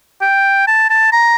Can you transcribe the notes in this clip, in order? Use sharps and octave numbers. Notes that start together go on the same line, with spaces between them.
G5
A5
A5
A#5